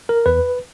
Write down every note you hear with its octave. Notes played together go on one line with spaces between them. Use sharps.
A#4
E2 B4